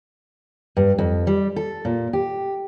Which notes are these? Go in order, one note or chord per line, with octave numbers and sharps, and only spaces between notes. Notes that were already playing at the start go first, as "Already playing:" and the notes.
G2
F2
G3
A4
A#2
G4